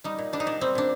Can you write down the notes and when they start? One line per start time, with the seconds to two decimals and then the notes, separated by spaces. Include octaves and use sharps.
0.04 G3 D#4
0.18 A#2
0.33 G3 D4
0.40 D#4
0.46 A#2 D4
0.61 G3 C4
0.75 A#2 D4